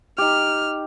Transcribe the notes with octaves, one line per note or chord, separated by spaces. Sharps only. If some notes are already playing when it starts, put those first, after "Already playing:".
D#4 G4 F6